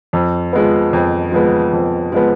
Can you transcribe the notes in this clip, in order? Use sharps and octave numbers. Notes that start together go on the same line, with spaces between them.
F2
F3 G#3 B3
F2
F3 G#3 B3
F2
F3 G#3 B3